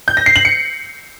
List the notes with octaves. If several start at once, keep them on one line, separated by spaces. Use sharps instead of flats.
G6
A#6
C7
F#7
C#7